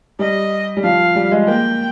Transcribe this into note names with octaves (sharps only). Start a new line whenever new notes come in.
G3 D#5
G3
F3 F5
G3
G#3
A#3 G5